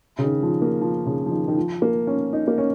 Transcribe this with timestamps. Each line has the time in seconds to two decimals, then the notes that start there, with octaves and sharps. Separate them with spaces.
0.19 C#3
0.23 D#3
0.43 F3
0.62 A#3
0.81 F3
1.06 C#3
1.26 F3
1.31 D#3
1.48 D#3
1.57 F3
1.82 A#3
2.07 C#4
2.33 D#4
2.48 A#3
2.58 C#4